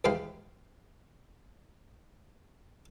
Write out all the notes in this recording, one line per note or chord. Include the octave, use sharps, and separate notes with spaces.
D#2 G#2 E3 F5 G5 B5